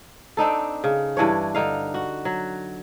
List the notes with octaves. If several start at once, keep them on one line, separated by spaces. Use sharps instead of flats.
C4 D4 D#4 A4
C#3
G2 E3 D4 C#5
D3 D#4 F5
F#4
F#3